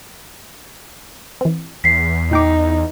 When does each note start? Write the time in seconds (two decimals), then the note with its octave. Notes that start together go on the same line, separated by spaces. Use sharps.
1.41 E3 C4
1.84 E2 B6 C7
2.31 A#2 D#4 G5 D6